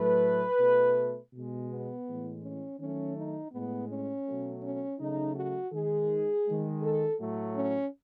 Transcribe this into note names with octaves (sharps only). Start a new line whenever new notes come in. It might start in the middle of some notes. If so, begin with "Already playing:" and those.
Already playing: A2 F#3 A3 B4
B2 A3
B2
G#3
B3
A2 E3 G#3
C#4
D#3 F#3 A3 C#4
D#4
A2 G#3 B3
C#4
B2 F#3 A3
C#4
C#3 F#3 A3 D#4
F#4
D#3 G#3 G#4
D#3 G#3
A4
A2 F#3 A3
C#4